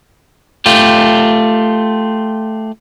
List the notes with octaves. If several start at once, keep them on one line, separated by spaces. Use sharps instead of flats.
A3 F4 G4